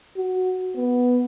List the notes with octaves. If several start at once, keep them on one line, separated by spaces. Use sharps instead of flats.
F#4
B3